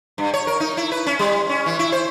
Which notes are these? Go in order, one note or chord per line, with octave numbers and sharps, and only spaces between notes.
G2
C#5
A#4
D#4
E4
B4
C#4
G3
C#4
E3
E4
C5